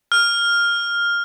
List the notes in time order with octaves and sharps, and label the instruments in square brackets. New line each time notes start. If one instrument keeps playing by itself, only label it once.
[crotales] F6